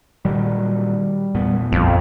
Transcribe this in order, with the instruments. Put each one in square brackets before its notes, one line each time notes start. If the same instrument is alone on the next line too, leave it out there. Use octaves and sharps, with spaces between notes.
[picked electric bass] A#2 D#3 F#3 [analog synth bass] G3
[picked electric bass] E2 A#2 B3
[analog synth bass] A#1 [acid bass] F2